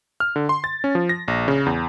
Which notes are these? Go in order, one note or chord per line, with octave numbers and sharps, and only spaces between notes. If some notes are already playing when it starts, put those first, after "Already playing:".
F6
D3
C6
A6
C#4
F3
A#6
A#1
C#3
E2